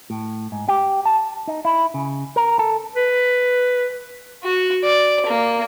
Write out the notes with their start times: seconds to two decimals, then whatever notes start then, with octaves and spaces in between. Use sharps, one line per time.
0.10 A2
0.52 G#2
0.68 G4
1.05 A5
1.48 D#4
1.65 E4
1.94 C#3
2.36 A#4
2.59 A4
2.96 B4
4.43 F#4
4.84 D5
5.26 A#3